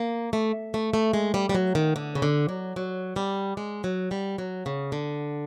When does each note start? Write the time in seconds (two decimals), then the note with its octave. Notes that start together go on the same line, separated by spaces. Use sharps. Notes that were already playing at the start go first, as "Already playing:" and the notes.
Already playing: A#3
0.33 A3
0.74 A3
0.94 A3
1.13 G#3
1.34 G3
1.49 G3
1.55 F#3
1.75 D#3
1.96 D3
2.15 C#3
2.22 D3
2.49 F#3
2.76 F#3
3.16 G3
3.57 G#3
3.84 F#3
4.11 G3
4.38 F#3
4.66 C#3
4.92 D3